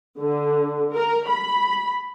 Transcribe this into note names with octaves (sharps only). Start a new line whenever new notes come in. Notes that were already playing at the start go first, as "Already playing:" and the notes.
D3
A#4
B5